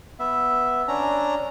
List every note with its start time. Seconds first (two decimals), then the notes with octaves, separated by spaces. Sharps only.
0.19 B3 E5
0.88 C#4 D4 A#5